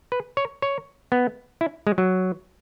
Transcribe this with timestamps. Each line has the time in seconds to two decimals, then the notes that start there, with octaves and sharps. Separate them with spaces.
0.12 B4
0.37 C#5
0.62 C#5
1.12 B3
1.61 E4
1.87 G#3
1.98 F#3